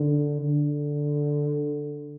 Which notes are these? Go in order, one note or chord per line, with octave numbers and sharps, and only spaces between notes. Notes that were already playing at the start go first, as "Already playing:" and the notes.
Already playing: D3
D3